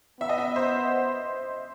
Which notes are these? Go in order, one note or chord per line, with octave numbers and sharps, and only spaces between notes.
B3 E5
D#5
E5
C5